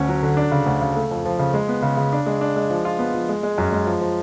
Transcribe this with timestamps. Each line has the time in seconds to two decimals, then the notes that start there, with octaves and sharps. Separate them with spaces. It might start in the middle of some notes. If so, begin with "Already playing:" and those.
Already playing: D2 C#4
0.09 F#3
0.22 D3
0.37 D4
0.51 C#3
0.66 D2
0.81 C#3
0.96 A3
1.11 F2
1.25 F3
1.39 C#3
1.54 G#3
1.68 B3
1.82 C#3
1.97 C#3
2.13 D4
2.26 G#3
2.41 D4
2.56 G#3
2.70 F3
2.85 F4
2.99 B3
3.14 F3
3.29 G#3
3.43 G#3
3.58 F#2
3.72 G#3
3.87 F3
4.01 F3